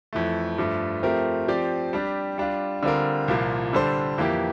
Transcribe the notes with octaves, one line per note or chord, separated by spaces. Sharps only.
F2 E3 A3
G2 F3 A3
F3 A3 C4 G4 A#4
F3 C4 G4 D5
G3 D4 G4
G3 D4 F4
D3 G3 C4 F4 A#4
C2 A#2 F3 A#3
D3 G3 D4 A4 C5
F2 E3 A#3 E4 G4